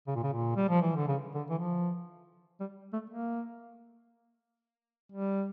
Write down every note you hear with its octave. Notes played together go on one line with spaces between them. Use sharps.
C#3
A#2
C#3
A#2
G3
F3
E3
D3
C#3
D3
E3
F3
G3
A3
A#3
G3